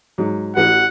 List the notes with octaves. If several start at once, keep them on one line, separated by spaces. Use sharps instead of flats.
G#2 F#3
A1 F#4 B4 F#5